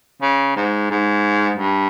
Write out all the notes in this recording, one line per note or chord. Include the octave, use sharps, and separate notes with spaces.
C#3
G#2
G#2
G2